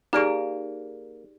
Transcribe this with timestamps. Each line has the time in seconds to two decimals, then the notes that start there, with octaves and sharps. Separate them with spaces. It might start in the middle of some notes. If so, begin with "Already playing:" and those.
0.13 A#3 D#4 G4 G#4 D5 D7